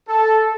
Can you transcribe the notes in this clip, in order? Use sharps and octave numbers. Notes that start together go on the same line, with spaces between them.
A4